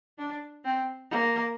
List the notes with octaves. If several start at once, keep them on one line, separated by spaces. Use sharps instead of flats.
D4
C4
A#3